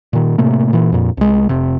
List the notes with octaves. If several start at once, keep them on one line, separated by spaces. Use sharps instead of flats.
A#2 D#3
A2 C3 A3 A#3
A#2 E3
F2 A#2
C2 G#3
F1 C3